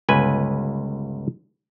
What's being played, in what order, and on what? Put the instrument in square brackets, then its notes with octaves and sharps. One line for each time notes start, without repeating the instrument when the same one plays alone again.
[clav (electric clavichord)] G1 C#2 B4 G#5